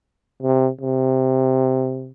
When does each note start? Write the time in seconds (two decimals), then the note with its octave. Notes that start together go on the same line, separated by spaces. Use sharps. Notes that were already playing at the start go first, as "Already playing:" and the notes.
0.43 C3
0.81 C3